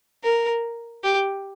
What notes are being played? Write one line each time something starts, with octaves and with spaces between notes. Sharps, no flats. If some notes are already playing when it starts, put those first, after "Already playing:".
A#4
G4